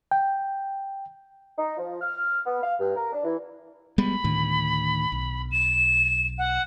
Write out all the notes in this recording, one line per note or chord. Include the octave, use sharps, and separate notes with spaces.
G5
D#4
F3
F6
B3
F5
G2
A#4
D4
E3
G3 G#3 B3 B5
D2 A2 D#3
B1
E7
F#5